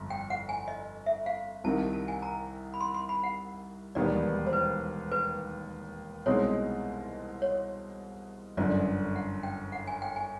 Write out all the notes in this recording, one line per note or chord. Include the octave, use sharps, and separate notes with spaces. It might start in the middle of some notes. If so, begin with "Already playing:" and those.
Already playing: G1 F2
G5
F#5
G#5
D#5
E5
F5
C2 C3 D#3 A5
A5
A5
G#5
A#5
B5
C6
C6
B5
F#5
E1 D#2 D#3 G3 B3 D5
C5
B4
B4
C2 B2 G#3 C4 D#4 C#5
C#5
G1 F#2 D3 D5
F#5
G5
F#5
G#5
G5
G#5